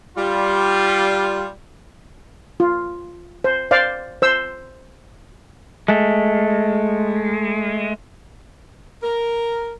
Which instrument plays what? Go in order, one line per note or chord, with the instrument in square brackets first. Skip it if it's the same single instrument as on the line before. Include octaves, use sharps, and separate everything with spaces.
[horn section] G3 F4
[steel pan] F4
C5
C5 D5 F5
C5 E6
[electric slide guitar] G#3 A3
[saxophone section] A#4